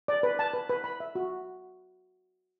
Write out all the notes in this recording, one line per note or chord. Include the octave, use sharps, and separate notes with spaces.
D5
B4
A5
B4
B4
B5
E5
F#4